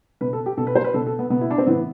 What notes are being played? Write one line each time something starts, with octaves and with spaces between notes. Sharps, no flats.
B2 B4
A4
G4
B2 A4
B4
C5
B4
B2 A4
A4
B3
B2 B3
E4
D4
C4
A2 E3 B3